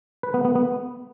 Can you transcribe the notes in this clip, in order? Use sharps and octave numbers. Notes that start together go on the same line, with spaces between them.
B4
B3
B3
B3